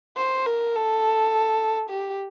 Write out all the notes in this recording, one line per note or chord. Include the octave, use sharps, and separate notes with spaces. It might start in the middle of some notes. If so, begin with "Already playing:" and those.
C5
A#4
A4
G4